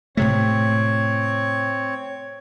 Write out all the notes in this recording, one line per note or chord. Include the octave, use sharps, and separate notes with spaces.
A2 C3 A3 C4 C#5